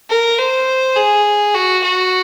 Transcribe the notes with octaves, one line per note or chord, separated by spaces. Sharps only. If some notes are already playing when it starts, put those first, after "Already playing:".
A#4
C5
G#4
F#4
F#4